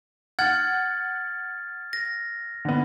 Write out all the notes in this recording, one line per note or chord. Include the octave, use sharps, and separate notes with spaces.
F#5 F6 G#6 A6
A#6
D3 B3